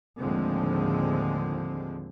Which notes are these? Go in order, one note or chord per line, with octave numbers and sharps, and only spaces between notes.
D#2 A2 D3 F3 G#3 C4